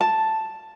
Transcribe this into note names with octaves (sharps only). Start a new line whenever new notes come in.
A5